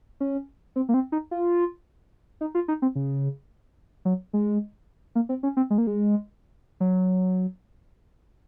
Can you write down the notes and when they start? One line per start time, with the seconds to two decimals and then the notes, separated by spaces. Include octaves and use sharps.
0.20 C#4
0.76 C4
0.89 A#3
0.94 C4
1.12 D#4
1.31 F4
2.41 D#4
2.55 F4
2.68 D#4
2.82 C4
2.95 C#3
4.05 F#3
4.33 G#3
5.15 A#3
5.29 C4
5.43 C#4
5.57 C4
5.70 G#3
5.78 A#3
5.87 G#3
6.80 F#3